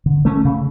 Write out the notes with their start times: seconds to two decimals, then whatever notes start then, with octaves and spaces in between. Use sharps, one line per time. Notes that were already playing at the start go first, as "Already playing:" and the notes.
0.06 D3
0.25 A3 C#4
0.45 C#3